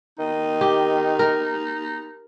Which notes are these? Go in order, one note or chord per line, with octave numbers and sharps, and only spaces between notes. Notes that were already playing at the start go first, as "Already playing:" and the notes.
D#3 D#4
G4
A#4